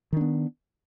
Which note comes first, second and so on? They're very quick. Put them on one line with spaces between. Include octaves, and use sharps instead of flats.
D#3 D4 B3